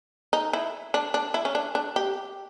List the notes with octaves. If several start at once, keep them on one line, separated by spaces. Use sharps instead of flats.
D#4
E4
D4
D4
E4
C#4
D4
D4
G4